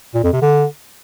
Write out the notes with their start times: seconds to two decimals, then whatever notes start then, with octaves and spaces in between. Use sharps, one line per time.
0.15 A#2
0.24 F2
0.33 C3
0.42 D3